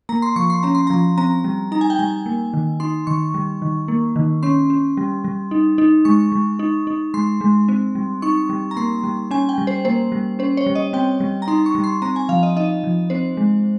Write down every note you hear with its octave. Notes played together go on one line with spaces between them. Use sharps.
A#3 A#5
C6
F3 C#6
C6
C#4 A#5
C6
F3 A#5
C4 A#5
G3
D#4 A#5
G#5
G5
G3 G#5
A#3
D#3
D#4 C6
D#3 C#6
G3
D#3
A#3
D#3
C#4 C6
C#4
G3
G3
D#4
D#4
G#3 C#6
G#3
D#4
D#4
G#3 C6
G#3
C4
G3
D#4 C#6
G3
A#5
A#3 C6
G3
C#4 G#5
G5
G3
C5
A#3 C5
G3
C#4 C5
C#5
G3
D#5
C4 G5
G3
A#5
D#4 C6
C#6
G3
C6
C4 A#5
G#5
F3 F5
D#5
D#4 D#5
F3
C4 C5
G#3